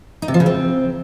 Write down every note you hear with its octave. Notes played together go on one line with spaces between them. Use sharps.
D#4
C3
F3
C#3
C4